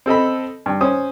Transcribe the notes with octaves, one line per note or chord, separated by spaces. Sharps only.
C4 A4 D#5 B5
G2
C#4 C5 D#6